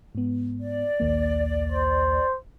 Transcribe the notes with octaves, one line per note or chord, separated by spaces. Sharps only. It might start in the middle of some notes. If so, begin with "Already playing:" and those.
G#2 B3
D5
A#1 D#2 A#3
C5